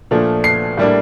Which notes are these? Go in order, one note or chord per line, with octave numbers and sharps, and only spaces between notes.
A#2 F3 A3 D4
C7
A2 G3 A#3 D4